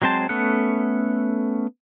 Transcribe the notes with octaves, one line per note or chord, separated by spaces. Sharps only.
F#3 G#3 C4 C5 A5
A3 B3 C#4 A4 F#5